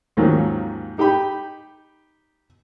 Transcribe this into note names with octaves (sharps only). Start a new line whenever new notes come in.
D#2 G#2 D#3 F3 F#3 C#4
D#4 G4 G5 B5